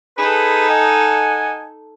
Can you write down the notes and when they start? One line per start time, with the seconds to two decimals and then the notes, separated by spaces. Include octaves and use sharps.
0.18 D#4 G#4 A4 B4
0.69 D#5 F#5 G#5